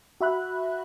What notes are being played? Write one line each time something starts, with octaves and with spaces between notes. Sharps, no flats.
F#4 E5 B5 F#6